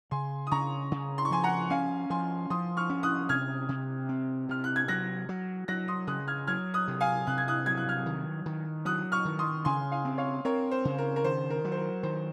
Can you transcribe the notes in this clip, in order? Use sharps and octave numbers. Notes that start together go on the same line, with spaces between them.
C#3 G#5 C6
D#6
C#3 A#5 C#6
C#3
C6
C#6
F3 G#5 C6
F#5 A#5
C#4 F5 G#5
F3 G#5 C6
F3 C6 D#6
C#6 F6
C#4
D#6 F#6
C3 F6 G#6
C3
C4
C3 F6
F#6
G#6
F#3 F#6 A#6
F#3
F#3 F#6 A#6
C6 D#6
C#3 D#6 F#6
F6 G#6
F#3 F6 G#6
D#6 F#6
C3
F5 G#5
C3 F#6
G#6
D#6 F#6
F#3 G#6
F#6
F6 G#6
D#3
D#3
F#3 D#6 F#6
C#6 F6
D#3
C6 D#6
C#3 G#5 C6
F5 G#5
C4
C#5 F5
C4 A#4 C#5
C5
C#3
A#4
A#4
D#3 C5
A#4
F#3
C5
A#4
D#3 C5